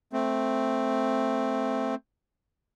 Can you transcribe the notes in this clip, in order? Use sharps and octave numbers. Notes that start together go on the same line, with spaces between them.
A3 C4